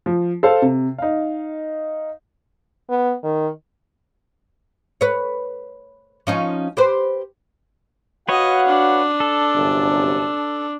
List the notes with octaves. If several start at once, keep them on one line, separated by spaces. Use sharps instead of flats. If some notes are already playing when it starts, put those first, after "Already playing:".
F3
A4 C5 F5
C3
D#4 F5
B3
D#3
B4 C#5
F3 C#4 D#4
G4 B4 C5
F#4 B4 C#5 D#5 F5 F#5
D4
A4
G1 F#2 C3